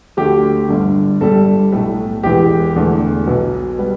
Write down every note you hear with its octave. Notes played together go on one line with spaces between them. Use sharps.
D2 D3 A3 G4
G1 G2 D3
G1 G2 G3 A4
B1 A2 A3
E1 E2 E3 G4
E1 E2 D3 A3
B1 B2 B3
G3 B3